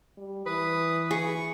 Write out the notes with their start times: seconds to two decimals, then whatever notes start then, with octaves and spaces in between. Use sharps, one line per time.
0.17 G3
0.46 E3 B4 D#6
1.11 G#4 C#6